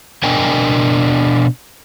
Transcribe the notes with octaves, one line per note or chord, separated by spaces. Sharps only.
B2 D4 A#4 D#5 G5 G#5